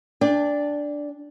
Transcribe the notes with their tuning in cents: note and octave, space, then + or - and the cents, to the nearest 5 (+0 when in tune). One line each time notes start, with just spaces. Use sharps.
D4 -5 D5 -5 G5 +40